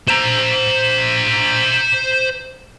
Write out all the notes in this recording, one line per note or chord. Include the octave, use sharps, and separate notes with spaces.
C5 A#5